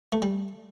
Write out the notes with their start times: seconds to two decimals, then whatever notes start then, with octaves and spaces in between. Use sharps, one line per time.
0.12 A3
0.22 G3